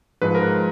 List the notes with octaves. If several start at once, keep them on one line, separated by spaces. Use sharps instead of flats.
G#2 F3 G#3 B4
A#4